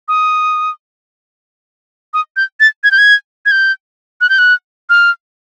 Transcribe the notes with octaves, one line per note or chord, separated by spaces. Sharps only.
D#6
D#6
G6
A6
G#6
G6
G#6
G#6
G6
F#6
G6
F#6
F6